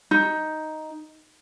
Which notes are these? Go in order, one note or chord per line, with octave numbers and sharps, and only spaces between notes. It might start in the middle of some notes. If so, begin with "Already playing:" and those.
D#4